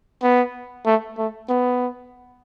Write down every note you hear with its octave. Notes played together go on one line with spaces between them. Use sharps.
B3
A3
A3
B3